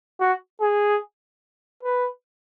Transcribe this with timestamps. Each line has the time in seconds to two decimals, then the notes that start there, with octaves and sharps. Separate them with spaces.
0.20 F#4
0.61 G#4
1.83 B4